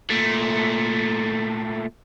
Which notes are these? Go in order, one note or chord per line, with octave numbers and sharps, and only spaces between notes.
A#2 A3